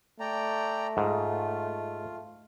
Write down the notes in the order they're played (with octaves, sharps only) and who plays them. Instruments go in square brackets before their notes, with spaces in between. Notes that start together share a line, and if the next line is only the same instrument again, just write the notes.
[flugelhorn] A3 [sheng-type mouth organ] D5 G5 A#5
[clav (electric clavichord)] G#2 [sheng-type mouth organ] F4